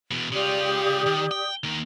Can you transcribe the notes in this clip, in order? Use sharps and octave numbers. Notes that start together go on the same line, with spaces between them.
E2 B2
C#3 F4 G4 D5 D#6
D#3
G5
D#3 A#3